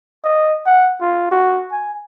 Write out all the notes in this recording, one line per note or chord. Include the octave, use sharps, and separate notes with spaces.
D#5
F#5
F4
F#4
G#5